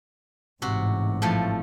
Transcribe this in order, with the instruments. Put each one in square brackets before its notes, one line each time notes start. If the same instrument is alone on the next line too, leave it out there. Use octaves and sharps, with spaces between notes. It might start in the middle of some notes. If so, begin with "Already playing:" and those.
[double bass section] A1 G#2 [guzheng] C3 F#4
[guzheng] A2 F3 A3